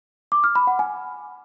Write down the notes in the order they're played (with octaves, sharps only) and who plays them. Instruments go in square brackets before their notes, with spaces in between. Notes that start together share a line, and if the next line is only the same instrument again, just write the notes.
[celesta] D6
F6
B5
F#5
G#5